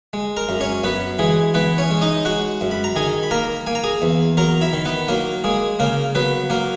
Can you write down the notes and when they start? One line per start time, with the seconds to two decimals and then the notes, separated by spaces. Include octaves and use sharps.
0.13 G#3
0.37 A#4 A#5
0.49 F#2
0.61 C#4 C#5
0.83 F#2 B3 B4
1.19 E3 G#3 G#4
1.54 E3 B3 B4
1.78 C#4 C#5
1.91 G#3
2.01 D#4 D#5
2.25 G#3 F#4 F#5
2.61 F#2
2.71 B5
2.84 A#5
2.96 D#3 G#4 G#5
3.23 B5
3.31 A#3 A#4 A#5
3.67 A#3 G#5
3.75 A#5
3.84 G#4 G#5
4.02 E2
4.37 F#3 A#4 A#5
4.61 E4 E5
4.73 D#3
4.85 B3 B4
5.08 F#3 A#3 A#4
5.44 G#3 A#3 G#4
5.79 C#3 A#3 A#4
6.15 F#3 B3 B4
6.50 F#3 A#3 A#4